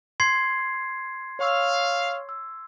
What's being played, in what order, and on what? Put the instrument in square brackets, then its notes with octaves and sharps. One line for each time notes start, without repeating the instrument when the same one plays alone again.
[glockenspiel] C6 G#6 C7
[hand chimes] C#5 C#6 E6 [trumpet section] F5
[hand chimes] E6